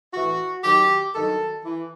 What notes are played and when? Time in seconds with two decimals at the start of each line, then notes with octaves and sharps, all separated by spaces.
0.13 A2 E3 F#4
0.64 F#2 D#3 F#3 G4
1.14 G2 D#3 F#3 A4
1.65 E3